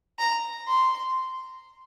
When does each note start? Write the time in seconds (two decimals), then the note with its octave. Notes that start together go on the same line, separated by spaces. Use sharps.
0.19 A#5
0.68 C6